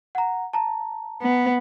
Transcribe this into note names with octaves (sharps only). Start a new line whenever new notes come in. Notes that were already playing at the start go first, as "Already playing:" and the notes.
F#5 A#5
A5 A#5
B3